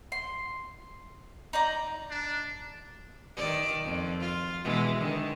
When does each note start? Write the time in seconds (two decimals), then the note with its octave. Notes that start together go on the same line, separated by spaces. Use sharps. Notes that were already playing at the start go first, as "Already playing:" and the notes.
0.12 C6
1.53 D#4 D5 A#5
2.11 D4
3.36 D#3 D5
3.84 F2
4.21 F4
4.64 B2 E3 G#3
4.99 D3 D#3